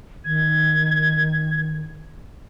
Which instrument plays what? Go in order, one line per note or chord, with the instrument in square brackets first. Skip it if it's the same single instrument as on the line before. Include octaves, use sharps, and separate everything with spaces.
[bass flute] D#3 [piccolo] G#6